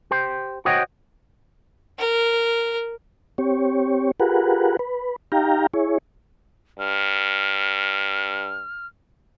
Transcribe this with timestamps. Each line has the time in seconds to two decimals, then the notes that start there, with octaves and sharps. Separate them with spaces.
0.11 G4 C5
0.65 F#4 C5 C#5 D#5 F#5 G5
1.99 A#4
3.38 C4 G4 C#5
4.20 F4 G4 G#4 A#4 B4 F#5
4.79 B4
5.32 D#4 G4 F5 G5 A#5
5.74 E4 G#4 C#5
6.79 G2 F6